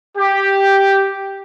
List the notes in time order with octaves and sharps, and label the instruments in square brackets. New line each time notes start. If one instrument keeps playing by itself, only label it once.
[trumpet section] G4